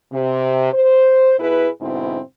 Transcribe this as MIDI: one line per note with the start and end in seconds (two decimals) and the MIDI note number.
0.12 0.71 48
0.73 1.35 72
1.39 1.68 47
1.39 1.68 64
1.39 1.68 68
1.39 1.68 71
1.81 2.20 44
1.81 2.20 47
1.81 2.20 50
1.81 2.20 60
1.81 2.20 64